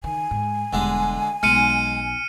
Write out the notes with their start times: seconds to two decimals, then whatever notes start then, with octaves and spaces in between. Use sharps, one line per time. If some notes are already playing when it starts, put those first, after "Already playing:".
0.04 D#3 G#5
0.31 G#2
0.73 E1 D3 G3 G#3
1.43 B1 G#3 F6 C#7 D#7